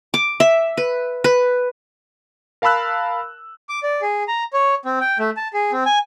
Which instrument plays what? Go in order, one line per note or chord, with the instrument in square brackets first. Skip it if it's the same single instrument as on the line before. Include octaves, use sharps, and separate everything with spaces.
[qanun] D6
E5
B4
B4
[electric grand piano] A#4 F5 A5 B5 E6 F#6
[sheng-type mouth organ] D6
D5
G#4
A#5
C#5
C4
G5
A3
A5
G#4
C4
G#5